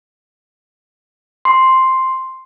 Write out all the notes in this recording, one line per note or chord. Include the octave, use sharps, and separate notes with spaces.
C6